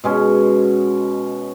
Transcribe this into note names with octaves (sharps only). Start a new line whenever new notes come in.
B2 G#3 C#4